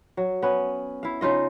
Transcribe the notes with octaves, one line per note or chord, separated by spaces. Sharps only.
F#3
B3 C#4
E4 F5
C#3 D#4 F4 D#5